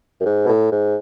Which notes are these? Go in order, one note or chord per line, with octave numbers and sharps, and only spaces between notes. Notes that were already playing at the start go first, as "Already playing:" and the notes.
F#2
G#2
B2
A2
G#2